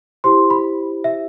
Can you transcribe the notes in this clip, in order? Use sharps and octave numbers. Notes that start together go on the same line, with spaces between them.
E4 G4 C5 C6
B5
E5